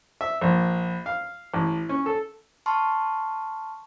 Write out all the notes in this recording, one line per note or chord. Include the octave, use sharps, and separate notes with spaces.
E5
A#1
F5
A1
C#4
A4
A5 C6 C#6 F6